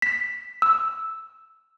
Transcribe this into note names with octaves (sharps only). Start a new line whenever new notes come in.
B6
E6